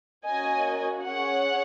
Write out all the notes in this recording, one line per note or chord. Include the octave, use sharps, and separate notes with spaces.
A#3 C#4 F#4 D#5 G#5
C#4 G#4 C#5 F#5